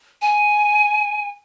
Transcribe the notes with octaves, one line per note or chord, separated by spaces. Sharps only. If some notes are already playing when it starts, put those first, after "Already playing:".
G#5